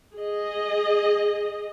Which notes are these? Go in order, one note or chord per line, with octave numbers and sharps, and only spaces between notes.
G#4 D#5